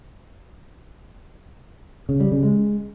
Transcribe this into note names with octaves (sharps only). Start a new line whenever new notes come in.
C#3
G3
C#3
G#3